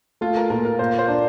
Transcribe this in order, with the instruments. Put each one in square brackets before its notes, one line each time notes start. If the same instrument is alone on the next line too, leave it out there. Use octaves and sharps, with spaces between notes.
[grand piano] A3 [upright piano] F4
[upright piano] A#4
[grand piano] A#2 [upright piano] A#4
[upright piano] A#4
[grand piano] A#3 [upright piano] C5
[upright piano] C5
[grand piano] D4